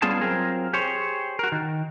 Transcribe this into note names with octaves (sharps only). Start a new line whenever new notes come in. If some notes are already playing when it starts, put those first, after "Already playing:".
G3 B3 C#4 F4 G#4 A5
F#3 C4 F4 G#4 A#4
G4 G#4 C5 C#5
F#4 A#4
D#3